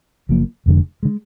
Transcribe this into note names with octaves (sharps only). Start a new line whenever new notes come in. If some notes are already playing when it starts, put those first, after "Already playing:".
F#1 F#2 F3 A#3
F1 F2 D3 G#3
D3 G#3